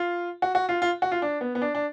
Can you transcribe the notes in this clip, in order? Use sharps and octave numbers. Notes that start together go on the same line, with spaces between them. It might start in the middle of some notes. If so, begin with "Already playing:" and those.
Already playing: F4
F#4
F#4
F4
F4
F#4
F4
D4
B3
B3
D4
D4